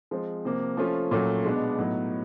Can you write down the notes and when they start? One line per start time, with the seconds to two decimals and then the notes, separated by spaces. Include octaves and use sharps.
0.11 F3 G#3 C4
0.45 C3 F3 A#3
0.77 F3 A3 C#4 F4
1.11 A#2 F#3 A3 C#4
1.44 B2 G#3 B3 D4
1.78 A2 F#3 B3 D#4